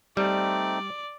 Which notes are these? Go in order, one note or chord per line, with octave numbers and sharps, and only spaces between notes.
G3 A3 C4 D#4 D5